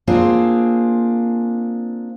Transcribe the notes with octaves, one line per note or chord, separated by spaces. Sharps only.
A#3 C4 D4 F4 G#4